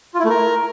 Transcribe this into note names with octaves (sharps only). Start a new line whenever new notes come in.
F4
E4
A3
A#4